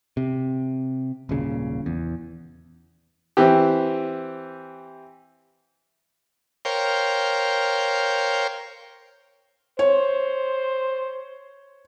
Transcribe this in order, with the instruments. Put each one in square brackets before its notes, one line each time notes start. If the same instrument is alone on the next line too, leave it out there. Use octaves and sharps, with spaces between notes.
[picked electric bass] C3
D#1 G#1 A#2 C#3
E2
[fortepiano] E3 C4 G4
[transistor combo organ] A#4 C5 C#5 F5 G5
[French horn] C5 [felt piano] C#5